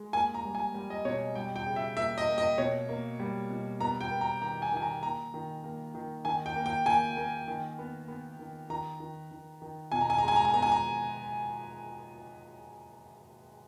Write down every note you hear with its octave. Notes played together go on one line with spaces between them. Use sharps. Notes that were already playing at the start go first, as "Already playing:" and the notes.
Already playing: G#3
A#3 G#5
A#5
G3
G#5
G3
D#5
B2 C#5
G3 G5
G5
C#3
E5
A#3 E5
D#5
A#3
D#5
B2 C#5
A#3
G3
B2
B3 A#5
G5
B3
A#5
D#3 A#5
G#5
D#3 G#5
A#5
A#3 A#5
D#3
A#3
D#3
D#3 G#5
G5
A#3
G5
A#3 G#5
A#3
D#3
B3
B3
D#3
D#3 A#5
D#3
D#3
D#3
B2 G#5
A#5
G#5
A#5
G#3
G#5
A#5
G#5
B3 A#5
G#5
A#5